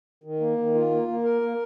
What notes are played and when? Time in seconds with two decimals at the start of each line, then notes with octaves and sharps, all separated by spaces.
0.24 D#3
0.40 A#3
0.57 D#3
0.74 F4
0.91 A#3
1.08 A#3
1.24 A#4
1.42 A#3